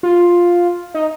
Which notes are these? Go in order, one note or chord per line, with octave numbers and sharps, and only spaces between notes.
F4
D#4